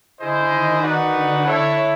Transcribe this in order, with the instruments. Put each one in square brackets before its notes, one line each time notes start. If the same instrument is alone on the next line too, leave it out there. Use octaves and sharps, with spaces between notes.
[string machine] D3 D4 [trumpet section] E4 G#4 C5 D#5
[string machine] D#3 D#4
[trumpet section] D#4 F#4 B4 D5 F#5
[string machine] D3 D4
[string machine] D3 D4 [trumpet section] E4 A4 C#5 E5